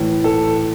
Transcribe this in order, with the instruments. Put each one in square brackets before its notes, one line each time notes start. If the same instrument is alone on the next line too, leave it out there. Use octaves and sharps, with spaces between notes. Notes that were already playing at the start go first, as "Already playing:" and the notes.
Already playing: [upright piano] A2 E3
A4